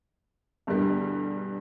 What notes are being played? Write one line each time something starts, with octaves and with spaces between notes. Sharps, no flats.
E2 G2 B2 D3 G3